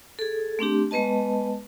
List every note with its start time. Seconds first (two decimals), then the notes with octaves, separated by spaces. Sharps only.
0.19 G#4 A4
0.59 A3 C4 D4 G4
0.91 G#3 B3 B4 D#5 A5